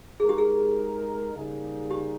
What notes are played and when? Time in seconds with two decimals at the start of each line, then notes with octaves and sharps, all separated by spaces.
0.20 G#3 D#4 G#4 A#4
0.29 G4
0.38 G#4
1.34 C#3 G3 A#3 D#4 G#4
1.90 G4